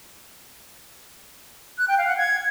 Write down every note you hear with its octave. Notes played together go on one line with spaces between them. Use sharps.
F#6
G5
F5
F#5
G#6